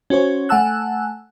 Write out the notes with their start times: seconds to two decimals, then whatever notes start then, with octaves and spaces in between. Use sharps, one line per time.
0.10 C#4 F#4 C5 C#5
0.49 A3 F#5 G#5 A5 E6 F#6